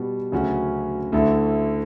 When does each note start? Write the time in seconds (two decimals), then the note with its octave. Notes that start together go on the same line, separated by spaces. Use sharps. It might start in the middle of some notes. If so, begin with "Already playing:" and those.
Already playing: B2 G3 B3 F#4
0.32 D2 C#3 F#3 C#4 F#4
1.12 D2 D3 A3 E4 A4